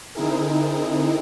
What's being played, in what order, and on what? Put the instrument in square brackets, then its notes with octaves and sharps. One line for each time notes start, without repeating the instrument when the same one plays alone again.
[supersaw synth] D3 C4 D#4 E4 G#4 A#4